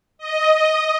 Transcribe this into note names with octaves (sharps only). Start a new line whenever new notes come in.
D#5